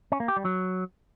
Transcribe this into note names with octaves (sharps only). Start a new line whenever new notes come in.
C#4
A#3
G4
G3
F#3